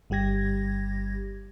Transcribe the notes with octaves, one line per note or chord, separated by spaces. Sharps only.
G1 G3 G4 G#6 A#6